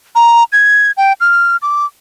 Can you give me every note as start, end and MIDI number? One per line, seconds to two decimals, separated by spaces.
0.15 0.44 82
0.52 0.92 92
0.97 1.13 79
1.20 1.56 89
1.62 1.85 86